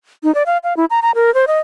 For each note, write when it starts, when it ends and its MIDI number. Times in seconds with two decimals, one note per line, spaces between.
0.24 0.34 63
0.35 0.43 74
0.46 0.58 77
0.64 0.76 77
0.77 0.85 64
0.90 1.00 82
1.02 1.11 82
1.15 1.33 70
1.34 1.45 72
1.47 1.59 75